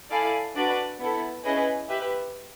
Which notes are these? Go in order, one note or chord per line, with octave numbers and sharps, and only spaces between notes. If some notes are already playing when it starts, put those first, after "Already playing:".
E4 A4 D5 F5 G#5
D4 F#4 B4 D5
B3 E4 A4
C#4 E4 G#4 B4 D#5
G4 B4 E5